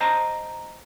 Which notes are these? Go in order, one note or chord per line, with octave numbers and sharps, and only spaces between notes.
C5 D#5 A5 A#5